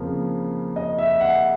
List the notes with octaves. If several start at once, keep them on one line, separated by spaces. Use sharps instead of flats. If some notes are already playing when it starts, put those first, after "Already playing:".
Already playing: F2 C#3 F3 A#3
D#5
E5
F#5